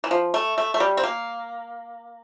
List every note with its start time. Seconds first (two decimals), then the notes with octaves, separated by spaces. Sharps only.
0.04 E3
0.11 F3
0.34 A3
0.58 A3
0.74 A3
0.80 G3
0.97 C4
1.03 A#3